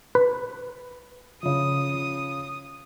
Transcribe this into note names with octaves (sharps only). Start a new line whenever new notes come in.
B4
C#3 F3 D#6